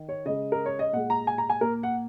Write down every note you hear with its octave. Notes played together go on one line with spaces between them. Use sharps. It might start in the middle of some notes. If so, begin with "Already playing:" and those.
Already playing: D#3
C#5
C#3 G#3 D#5
A#4
C#5
D#5
A#2 G#3 F#5
A#5
G#5
A#5
G#5
A#2 A#3 A#4
F#5